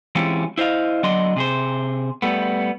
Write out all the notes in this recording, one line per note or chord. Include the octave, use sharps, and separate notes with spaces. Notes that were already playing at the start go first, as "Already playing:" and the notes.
E3 G#3 C4 C#4 F4 G4
E4 C5 D#5 F5
D3 F#3 A4 D5 D#5 C6
C3 G#4 C5
G3 A3 B3